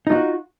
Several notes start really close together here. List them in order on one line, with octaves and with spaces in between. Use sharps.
D#4 F4 F#4